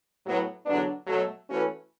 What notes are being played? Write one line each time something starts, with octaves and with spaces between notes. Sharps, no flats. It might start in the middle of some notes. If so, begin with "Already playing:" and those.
A2 F#3 B3
E2 D3 F#3 B3 D4
B2 F#3 A3
E3 A3 C#4 F#4 B4